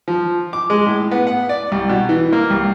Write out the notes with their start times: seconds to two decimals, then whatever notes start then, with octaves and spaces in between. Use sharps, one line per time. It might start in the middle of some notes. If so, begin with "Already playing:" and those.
0.08 F3
0.53 D6
0.70 G#3
0.86 A2
1.11 B3
1.27 F#5
1.49 D5
1.72 C2
1.89 B2
2.09 E3
2.33 A#3
2.50 C2